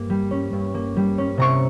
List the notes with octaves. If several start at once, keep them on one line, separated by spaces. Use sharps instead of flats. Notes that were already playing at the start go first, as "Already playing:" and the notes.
Already playing: G2 A#3
G3
C#4
G2
A#3
G3
C#4
C3 A#5 C#6